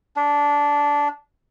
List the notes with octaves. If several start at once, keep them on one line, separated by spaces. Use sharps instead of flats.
D4